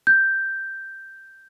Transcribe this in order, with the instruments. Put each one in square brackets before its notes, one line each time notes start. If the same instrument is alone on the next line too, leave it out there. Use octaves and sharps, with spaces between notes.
[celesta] G6